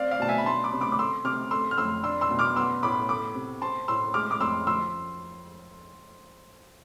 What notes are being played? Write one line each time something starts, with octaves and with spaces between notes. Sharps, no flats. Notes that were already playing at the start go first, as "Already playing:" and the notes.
Already playing: C4 D5 F5
D5 F5
B2 A5
E5 G#5
B5
D4 A5 C6
B5 D6
C3
B5 D6
D6
A3 C6 E6
C3 D6 F6
A3 C6 E6
F6
F2 C6 E6
D4 C6 E6
C6 E6
B2
D6 F6
B3 C6 E6
A2 B5 D6
A3 B5 D6
C3
C4 A5 C6
A2 C6 E6
G#3 D6 F6
D6
F2 C6 E6
F3 C6 E6